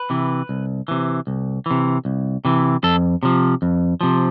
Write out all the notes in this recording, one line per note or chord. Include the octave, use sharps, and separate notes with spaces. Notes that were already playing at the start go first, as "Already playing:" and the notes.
Already playing: B4
C3 E3
C2
C3 E3
C2
C3 E3
C2
C3 E3
F2 A4
C3 F3
F2
C3 F3